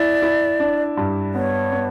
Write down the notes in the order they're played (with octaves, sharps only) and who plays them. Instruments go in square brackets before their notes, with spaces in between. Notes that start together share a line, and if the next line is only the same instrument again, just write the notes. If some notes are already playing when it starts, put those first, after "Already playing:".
Already playing: [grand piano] E4 [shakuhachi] D5
[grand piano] E4
D4
G2
[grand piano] B3 [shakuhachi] C#5
[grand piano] B3